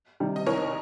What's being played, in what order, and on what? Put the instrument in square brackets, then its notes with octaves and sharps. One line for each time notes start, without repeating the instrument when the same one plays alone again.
[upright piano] C3 D#3 G3
[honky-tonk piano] D#5
[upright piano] C2 [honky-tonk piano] A#4 C#5